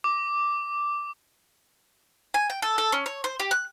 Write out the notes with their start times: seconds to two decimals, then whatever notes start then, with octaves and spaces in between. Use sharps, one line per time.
0.04 D6
2.34 G#5
2.50 G5
2.62 A4
2.78 A4
2.92 C#4
3.06 C#5
3.24 C5
3.40 G4
3.51 F#6